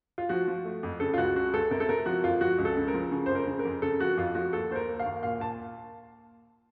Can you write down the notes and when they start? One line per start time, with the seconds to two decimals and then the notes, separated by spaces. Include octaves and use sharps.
0.18 F4
0.29 F3 F#4
0.48 F3
0.64 A3
0.83 F2
1.00 C#3 A4
1.14 F4
1.18 C#2 F#4
1.35 C#3 F#4
1.53 C#2 A4
1.71 C3 A#4
1.80 A4
1.89 C3 A#4
2.06 F3 F#4
2.24 F2 F4
2.41 F3 F#4
2.58 C#2
2.65 A4
2.77 C#3
2.88 A#4
2.94 F3
3.11 C#3
3.26 F2 C5
3.35 A#4
3.47 C#3
3.59 A#4
3.65 F2
3.82 C#3 A4
4.00 F3 F#4
4.17 F2 F4
4.35 F3 F#4
4.53 D#2 A4
4.70 D#2 C5
4.76 A#4
4.88 A#3
4.99 F5
5.06 D#2
5.23 A#2 F5
5.40 A#2 A5